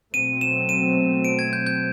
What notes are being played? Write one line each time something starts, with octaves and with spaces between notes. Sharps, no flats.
B2 F#3 A3 C4 D#7
E7
D#7
D7
G#6
G6
G6